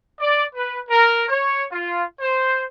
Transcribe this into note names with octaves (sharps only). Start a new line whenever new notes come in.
D5
B4
A#4
C#5
F4
C5